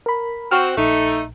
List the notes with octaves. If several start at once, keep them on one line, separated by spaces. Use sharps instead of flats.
A#4 B5
C4 F#4 C#6 F6
A#1 A3 D#4